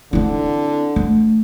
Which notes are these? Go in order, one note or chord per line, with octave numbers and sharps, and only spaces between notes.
D3 C4 E4
A3